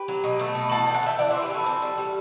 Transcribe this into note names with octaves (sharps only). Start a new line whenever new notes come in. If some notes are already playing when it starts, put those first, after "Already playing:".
Already playing: G4 B4
F#3
B2
A3
B2
E3 F#5 A5
D4
G5
F#5 A5
A3
E5 G5
E3 D5 F#5
C5 E5
E3
G4 B4
E3 F#4 A4
C4
G3
G3